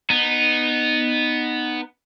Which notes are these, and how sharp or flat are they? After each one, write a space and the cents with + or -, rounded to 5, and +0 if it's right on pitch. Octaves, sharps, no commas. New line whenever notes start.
B3 +0 D#4 -15